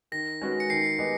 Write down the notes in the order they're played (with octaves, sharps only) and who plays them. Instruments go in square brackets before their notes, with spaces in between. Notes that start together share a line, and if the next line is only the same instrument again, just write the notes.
[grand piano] D#3 [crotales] A#6
[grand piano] G#3 C#4 F#4 B4
[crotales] C#7
[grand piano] D#3 [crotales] C7
[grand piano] G#3 B3 D#4 G4